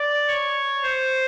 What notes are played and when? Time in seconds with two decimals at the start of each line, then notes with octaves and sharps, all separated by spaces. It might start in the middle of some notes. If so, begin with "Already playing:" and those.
Already playing: D5
0.27 C#5
0.83 C5